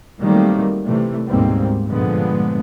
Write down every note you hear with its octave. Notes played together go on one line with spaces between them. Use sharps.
D#3 F#3 G3 A3 A#3 C4
C3 E3 G3 A3
D2 G#2 B2 G3 A#3 C4
G2 A#2 D3 F3 G#3 B3